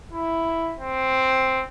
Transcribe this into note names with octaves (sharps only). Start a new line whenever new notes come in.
E4
C4